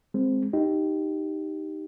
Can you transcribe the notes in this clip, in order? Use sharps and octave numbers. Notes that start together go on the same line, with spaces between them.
G#3 C4
D#4 G4